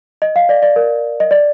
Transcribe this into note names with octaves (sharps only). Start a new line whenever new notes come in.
D#5
F5
D5
D5
A#4
D#5
D5